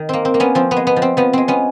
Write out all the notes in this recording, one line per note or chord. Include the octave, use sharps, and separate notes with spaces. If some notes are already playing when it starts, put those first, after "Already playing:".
Already playing: D#3
A#3 C4
C4
A#3
B3 C#4
F3 C4
B3
G#3
B3
F3
C4
F3 B3
G#3 C4
B3 C#4